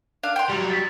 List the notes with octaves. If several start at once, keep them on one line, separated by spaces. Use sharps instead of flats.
D4 F5
G5 C6
F#3 G3
A6 B6